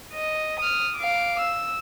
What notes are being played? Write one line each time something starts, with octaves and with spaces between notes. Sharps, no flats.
D#5
D#6 F6
F5 D6
E6